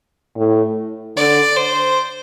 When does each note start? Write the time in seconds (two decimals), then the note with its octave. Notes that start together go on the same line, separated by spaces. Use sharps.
0.37 A2
1.17 D3 D5
1.56 C5